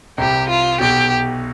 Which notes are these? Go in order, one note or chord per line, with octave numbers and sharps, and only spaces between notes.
C2 C3 G4
F4
B1 B2 G4